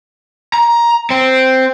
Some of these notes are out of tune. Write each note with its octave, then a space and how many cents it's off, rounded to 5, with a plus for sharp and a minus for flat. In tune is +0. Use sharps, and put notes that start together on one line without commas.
A#5 +15
C4 -5